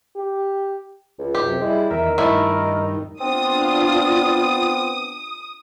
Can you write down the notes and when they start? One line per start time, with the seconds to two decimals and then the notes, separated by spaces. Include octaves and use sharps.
0.16 G4
1.19 C#2
1.35 F#2 C3 G4
1.61 G3 G#3 E4
1.91 E2 D#3 A#4 E5
2.18 G2 A3 D#4 E4
3.21 B3 C4 D4 F4 D#6